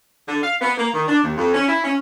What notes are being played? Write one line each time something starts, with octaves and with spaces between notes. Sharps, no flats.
D3
F5
B3
A#3
D#3
D4
D#2
F2
C#4
E4
C#4